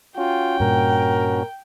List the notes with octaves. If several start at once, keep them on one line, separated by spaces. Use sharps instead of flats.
C#4 F4 F#4 G5
G2 A#2 A#4